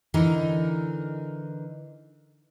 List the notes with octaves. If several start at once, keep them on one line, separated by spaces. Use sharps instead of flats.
D3 E3 D#4 A#4